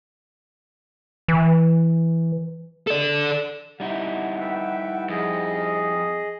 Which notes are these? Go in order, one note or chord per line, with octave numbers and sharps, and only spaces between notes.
E3
A4 D5
G3 D#4 E4 F#5
B4 E5 G5
F2 G#4 D#5